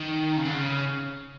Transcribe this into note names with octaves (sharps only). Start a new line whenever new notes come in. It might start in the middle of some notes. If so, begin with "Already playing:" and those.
Already playing: D#3
C#3
D3
C#3